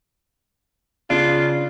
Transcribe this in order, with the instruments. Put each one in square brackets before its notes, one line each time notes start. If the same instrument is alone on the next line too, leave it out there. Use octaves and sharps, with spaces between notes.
[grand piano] C#3 D4 D7 [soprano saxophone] F4